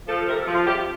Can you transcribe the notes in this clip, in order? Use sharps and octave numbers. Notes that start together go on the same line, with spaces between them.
F3 A4
A4
C3 A#4
A4
F3
F4
C3 G4